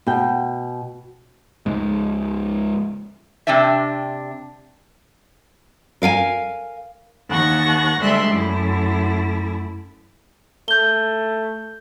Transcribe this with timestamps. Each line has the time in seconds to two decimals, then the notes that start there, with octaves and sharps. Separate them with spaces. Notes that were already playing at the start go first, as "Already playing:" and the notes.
0.07 B2 G5
1.66 C#2 G#2
3.47 C3 C4 D4 D5 E5
6.02 A#4 F5 G5 G#5
7.28 D#2 F#5 C#6 A#6
8.01 D2 G3 G#3 E5 C6 F#6
8.31 F#2 A3 E4
10.68 A3 G6 G7